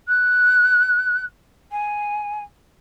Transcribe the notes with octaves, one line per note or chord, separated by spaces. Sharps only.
F#6
G#5